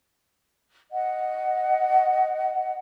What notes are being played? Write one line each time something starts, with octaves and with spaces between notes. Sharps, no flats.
D#5 F#5